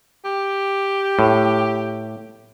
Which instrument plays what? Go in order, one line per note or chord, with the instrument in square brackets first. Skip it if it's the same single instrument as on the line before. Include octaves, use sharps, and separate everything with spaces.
[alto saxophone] G4
[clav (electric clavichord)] A2